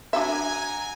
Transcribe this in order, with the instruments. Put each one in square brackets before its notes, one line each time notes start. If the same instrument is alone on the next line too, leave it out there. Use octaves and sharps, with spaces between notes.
[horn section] F#3 G#5 [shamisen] D4 F#4 E5 [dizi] A#5